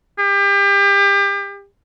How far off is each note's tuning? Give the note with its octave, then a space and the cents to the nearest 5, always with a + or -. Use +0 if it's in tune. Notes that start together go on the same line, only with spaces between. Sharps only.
G4 +30